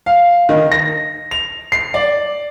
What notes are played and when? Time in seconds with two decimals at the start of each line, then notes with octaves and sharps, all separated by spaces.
0.06 F5
0.49 D#3
0.72 A#6
1.31 F7
1.72 C7
1.94 D5